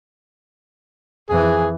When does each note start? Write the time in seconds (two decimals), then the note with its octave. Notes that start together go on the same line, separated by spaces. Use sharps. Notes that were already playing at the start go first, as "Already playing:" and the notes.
1.30 F2 E3 G#4